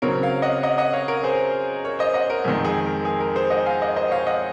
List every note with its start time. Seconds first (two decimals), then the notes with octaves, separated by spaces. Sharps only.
0.02 C#3 F#3 C4 A#4 C#5
0.23 C#5 F5
0.42 D#5 F#5
0.63 D#5 F#5
0.78 D#5 F#5
0.93 C#5 F5
1.08 A#4 C#5
1.23 G#4 C5
1.84 A#4 C#5
1.99 C5 D#5
2.14 D#5 F#5
2.30 A#4
2.44 F2 D#3 G#3 G#4
2.64 G#4
2.86 A#4
3.05 G#4
3.20 A#4
3.35 G#4 C5
3.50 D#5 F#5
3.66 F5 G#5
3.81 D#5 F#5
3.96 C5 D#5
4.11 C#5 F5
4.27 D#5 F#5